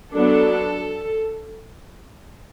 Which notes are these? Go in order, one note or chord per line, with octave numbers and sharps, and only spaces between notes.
F#3 B3 D4 A4